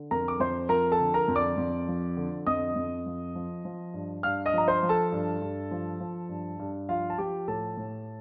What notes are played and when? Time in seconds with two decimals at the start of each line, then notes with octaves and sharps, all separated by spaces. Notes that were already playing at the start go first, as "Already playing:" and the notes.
Already playing: D3
0.11 F2 A#4 A#5
0.28 D6
0.40 F2 C5 C6
0.69 F3 A#4 A#5
0.92 A4 A5
1.00 D3
1.14 A#4 A#5
1.28 F2
1.36 D5 D6
1.57 F2
1.88 F3
2.17 D3
2.47 F2 D#5 D#6
2.76 F2
3.06 F3
3.35 F3
3.65 F3
3.94 G2
4.23 G2 F5 F6
4.46 D#5 D#6
4.53 F3 A#5
4.68 C5 C6
4.83 F3
4.89 A4 A5
5.12 G2
5.42 G2
5.71 F3
6.00 F3
6.29 G2
6.59 G2
6.89 F3 F4 F5
7.10 A5
7.18 F3 G4 G5
7.48 A2 A4 A5
7.77 A2